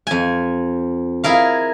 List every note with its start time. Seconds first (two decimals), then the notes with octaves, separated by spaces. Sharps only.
0.07 F2 G#5
1.24 E4 G#4 A#4 F5